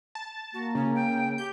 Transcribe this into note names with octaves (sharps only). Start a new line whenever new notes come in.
A5
A#3 F#4
C#3 C#4
G5
G4 G6